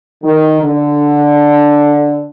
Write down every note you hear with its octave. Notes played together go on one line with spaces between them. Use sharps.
D#3
D3